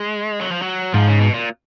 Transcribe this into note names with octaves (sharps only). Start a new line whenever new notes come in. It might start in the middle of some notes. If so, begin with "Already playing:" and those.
Already playing: G#3
F#3
F3
F#3
G#2 F3
C#3
B2
A#2